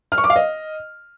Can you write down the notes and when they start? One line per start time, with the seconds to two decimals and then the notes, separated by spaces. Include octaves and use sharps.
0.12 F6
0.18 C#6
0.24 D6
0.30 F5
0.36 D#5